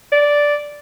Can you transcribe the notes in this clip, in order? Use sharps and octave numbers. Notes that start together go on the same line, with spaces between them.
D5